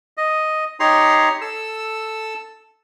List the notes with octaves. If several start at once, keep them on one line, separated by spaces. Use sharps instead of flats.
D#5
D#4 G4 C#5 A#5 C6
A4 E6